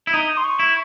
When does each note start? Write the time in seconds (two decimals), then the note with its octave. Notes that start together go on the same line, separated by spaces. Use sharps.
0.07 E4
0.13 D#4 D#6
0.37 C6
0.44 C#6
0.60 E4